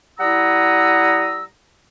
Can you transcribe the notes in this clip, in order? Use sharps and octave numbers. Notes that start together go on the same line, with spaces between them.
G3 E4 F#5 A#5 D#6 E6